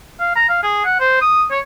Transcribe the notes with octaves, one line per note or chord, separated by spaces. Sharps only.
F5
A#5
F5
G#4
F#5
C5
D#6
C#5